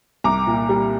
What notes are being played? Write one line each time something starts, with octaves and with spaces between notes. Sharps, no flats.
C2 A#5 D6
A#2
G3